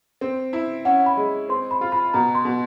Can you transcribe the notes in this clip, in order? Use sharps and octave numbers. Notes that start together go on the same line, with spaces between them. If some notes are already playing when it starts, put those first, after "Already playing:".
C4
E4
C#4 F#5
B5
G#3
C4 C6
B5
F4
B5
B2 A#5
C6
B2